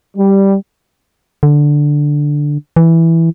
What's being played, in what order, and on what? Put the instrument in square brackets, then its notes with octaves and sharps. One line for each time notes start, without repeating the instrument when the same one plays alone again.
[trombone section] G3
[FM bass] D3
E3